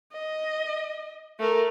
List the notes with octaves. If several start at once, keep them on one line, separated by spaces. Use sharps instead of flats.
D#5
A3 A#4